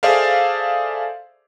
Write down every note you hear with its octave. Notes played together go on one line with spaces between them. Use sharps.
G#4 A4 C5 D5 E5 F5